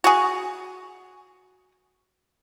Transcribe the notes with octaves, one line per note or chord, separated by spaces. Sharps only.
F#4 G#4